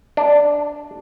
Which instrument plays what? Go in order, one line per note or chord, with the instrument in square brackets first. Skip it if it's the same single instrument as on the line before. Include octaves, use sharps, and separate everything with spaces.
[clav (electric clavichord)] D4